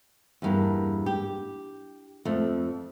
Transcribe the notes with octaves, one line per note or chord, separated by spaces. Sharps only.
E2 G2 A#3
G4
F2 A3